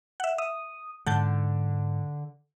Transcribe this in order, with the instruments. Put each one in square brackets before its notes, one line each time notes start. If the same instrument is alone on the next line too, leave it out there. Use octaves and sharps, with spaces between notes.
[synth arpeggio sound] E5 F#5
[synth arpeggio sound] E5 [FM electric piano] D#6
[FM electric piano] G#2 [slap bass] D3 [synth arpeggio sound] F#5 A5 G6